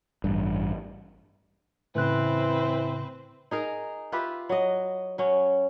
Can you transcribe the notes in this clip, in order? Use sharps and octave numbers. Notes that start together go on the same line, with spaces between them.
A1 G2
A2 C#3 E3 C4 B4 C5 F#6
D#4 G#4 A#4
F4 G4 B4 E5
F#3 D#5
F#3 C#4